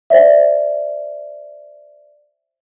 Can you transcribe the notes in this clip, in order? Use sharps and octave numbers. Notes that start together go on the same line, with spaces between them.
C5 D5 E5